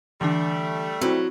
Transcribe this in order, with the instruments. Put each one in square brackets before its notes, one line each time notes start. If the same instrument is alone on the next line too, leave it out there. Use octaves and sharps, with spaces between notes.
[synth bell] D3 E3 D4 [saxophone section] G3 A3
[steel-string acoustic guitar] F#3 [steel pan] C4 E4